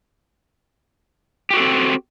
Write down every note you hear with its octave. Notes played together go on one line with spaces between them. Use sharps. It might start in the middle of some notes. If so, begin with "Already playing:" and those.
C4 F#4 G4 A4